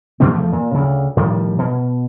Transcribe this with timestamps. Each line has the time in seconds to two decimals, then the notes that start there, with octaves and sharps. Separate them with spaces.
0.20 A#2 D3 G3 C4
0.32 E2 F3 A3
0.52 A#2
0.74 D2 C#3
1.17 A2 D#3 F3 G3
1.59 B2